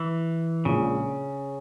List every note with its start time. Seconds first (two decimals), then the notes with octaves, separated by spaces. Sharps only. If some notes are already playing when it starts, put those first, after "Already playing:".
Already playing: E3
0.65 A#1 A#2 C#3 G#3